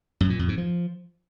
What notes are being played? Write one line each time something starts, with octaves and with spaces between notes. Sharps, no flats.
F#2
A#2
F2
G#2
F3